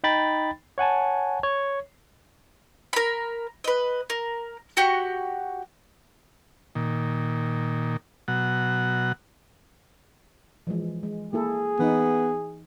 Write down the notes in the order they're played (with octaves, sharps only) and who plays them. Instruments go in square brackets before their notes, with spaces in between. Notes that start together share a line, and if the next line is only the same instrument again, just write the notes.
[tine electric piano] D#4 G5 B5 A6
C#5 F#5 G#5 A5
C#5
[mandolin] A#4 B5
B4 D#5
A#4
F#4 G4 F#5
[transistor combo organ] A#2 D#3
B2 F#3 F#5
[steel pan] E3 F3 G#3
G#3
[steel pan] A#3 E4 A4 [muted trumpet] G#4
[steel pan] E3 D#4 [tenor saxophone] B3